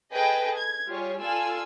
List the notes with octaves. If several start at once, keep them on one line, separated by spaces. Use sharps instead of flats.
G#4 A4 B4 D#5 G5
G#6
G3 F4 G4 G#4 C#5
F4 A4 D5 F5 G#5 E6